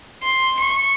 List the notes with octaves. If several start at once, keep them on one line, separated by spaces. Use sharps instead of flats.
C6
C#6